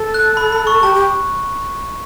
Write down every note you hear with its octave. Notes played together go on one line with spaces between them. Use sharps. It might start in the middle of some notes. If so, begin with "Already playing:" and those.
Already playing: A4
F#6
B5
B5
C#6
G4 A5
G4